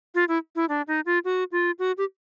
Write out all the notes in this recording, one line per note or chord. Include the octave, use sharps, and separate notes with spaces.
F4
E4
E4
D4
D#4
F4
F#4
F4
F#4
G4